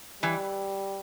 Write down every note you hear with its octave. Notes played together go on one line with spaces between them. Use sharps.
E3 G3